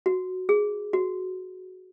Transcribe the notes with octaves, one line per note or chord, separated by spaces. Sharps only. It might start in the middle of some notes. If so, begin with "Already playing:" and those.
F#4
G#4
F#4